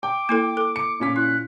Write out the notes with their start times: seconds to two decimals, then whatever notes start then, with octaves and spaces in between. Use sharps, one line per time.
0.03 G5 D6
0.29 A#3 E4 A4
0.57 A4
0.76 C#7
1.00 A#2 C#4 D6 B6
1.16 E4 F#6